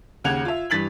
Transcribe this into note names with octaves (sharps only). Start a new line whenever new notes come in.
D#2 C#3 F#5 G#6 F7
F4 E5
G2 E3 A6 B6 F#7